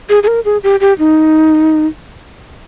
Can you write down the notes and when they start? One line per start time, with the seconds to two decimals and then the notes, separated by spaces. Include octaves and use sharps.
0.09 G#4
0.23 G#4
0.28 A#4
0.45 G#4
0.63 G4
0.81 G4
0.99 D#4